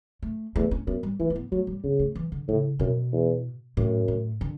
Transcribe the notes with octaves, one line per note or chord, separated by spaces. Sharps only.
A3
E2 A3
C#4
F#2 B3
G3
E3 A3
A3
B3
F#3 A3
G3
C#3 B3
A3
E3
D3
A2 C#3
F#2 B2
E2
F#2 A2
A2
D3